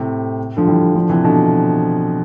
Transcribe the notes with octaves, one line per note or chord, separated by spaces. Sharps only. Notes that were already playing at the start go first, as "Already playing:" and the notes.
Already playing: A2 C3
D3 F3
E3 G3
D3 F3
C3 E3
B2 D3